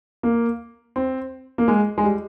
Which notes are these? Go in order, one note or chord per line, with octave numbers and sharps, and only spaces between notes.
A#3
C4
A#3
G#3
G#3
G3